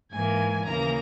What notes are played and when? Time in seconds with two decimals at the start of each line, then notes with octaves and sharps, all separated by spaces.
0.11 G#2 E3 A#3 G#5
0.64 D#2 C#3 E3 A#3 A#5